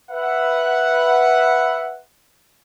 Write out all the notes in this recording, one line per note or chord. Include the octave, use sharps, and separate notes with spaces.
B4 E5 F#5